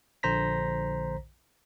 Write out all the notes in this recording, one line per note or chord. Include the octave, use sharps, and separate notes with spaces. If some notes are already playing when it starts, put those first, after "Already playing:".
A#1 D3 C5 A#5 A#6 B6